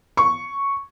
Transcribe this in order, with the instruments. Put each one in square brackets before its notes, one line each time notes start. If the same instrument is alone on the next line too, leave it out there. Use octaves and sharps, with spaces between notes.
[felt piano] C#6